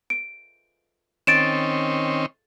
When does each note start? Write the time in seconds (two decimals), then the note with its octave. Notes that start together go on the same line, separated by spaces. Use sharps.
0.10 D7
1.27 D#3 C4 C#4 A6 D7 E7